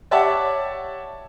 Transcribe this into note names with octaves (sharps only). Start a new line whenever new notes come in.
G4 C#5 D5 E5 F#5 A5